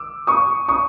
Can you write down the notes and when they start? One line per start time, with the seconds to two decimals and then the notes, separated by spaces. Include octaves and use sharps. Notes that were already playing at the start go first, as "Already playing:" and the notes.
Already playing: D6 E6
0.27 C#6 D#6
0.68 C#6 D#6